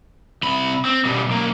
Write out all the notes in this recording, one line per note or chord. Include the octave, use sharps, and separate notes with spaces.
C2 B5
C4
B2 G3
B1 A#3